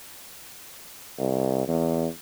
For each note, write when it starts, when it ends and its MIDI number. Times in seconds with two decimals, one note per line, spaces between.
1.18 1.65 36
1.68 2.07 40